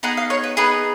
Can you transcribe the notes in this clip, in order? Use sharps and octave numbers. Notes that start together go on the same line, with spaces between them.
B3 D#4 G#4 F#5
F5
C#5
B4
B3 D#4 G#4 B4